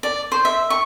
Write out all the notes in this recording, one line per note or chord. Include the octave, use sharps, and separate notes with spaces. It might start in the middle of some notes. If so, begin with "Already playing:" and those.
D5
C5
E5
C#6